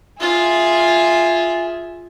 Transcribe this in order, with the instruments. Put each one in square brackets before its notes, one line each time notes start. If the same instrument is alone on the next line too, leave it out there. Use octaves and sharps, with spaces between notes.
[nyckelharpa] F4 [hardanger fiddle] G#4 E5